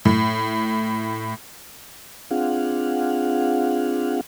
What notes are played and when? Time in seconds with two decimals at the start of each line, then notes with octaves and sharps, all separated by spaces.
0.05 A2
2.31 C4 D4 F4 G#4 F5 F#5